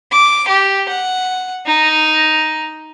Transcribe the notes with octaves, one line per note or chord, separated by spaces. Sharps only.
D6
G4
F#5
D#4